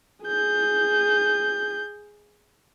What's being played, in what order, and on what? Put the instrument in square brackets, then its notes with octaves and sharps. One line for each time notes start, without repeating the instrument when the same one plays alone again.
[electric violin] G#4 G6